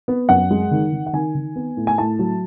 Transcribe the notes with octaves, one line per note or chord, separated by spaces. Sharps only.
B3
F#2 F#5
G#3
D#3
D#3
F#5
D#3 G#5
D#3
B3
A2
G#5
A2 A5
F#3